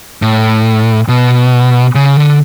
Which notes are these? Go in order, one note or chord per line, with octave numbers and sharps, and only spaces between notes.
A2
B2
C#3
D3